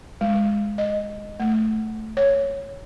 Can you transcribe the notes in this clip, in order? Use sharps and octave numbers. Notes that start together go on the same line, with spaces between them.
G#3
D#5
A3
C#5